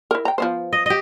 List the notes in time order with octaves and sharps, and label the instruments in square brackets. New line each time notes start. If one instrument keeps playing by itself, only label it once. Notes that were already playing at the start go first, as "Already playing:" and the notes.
[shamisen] E4 A#4
G5 A#5
F3 B3 C5
[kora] D#5
G4 D#5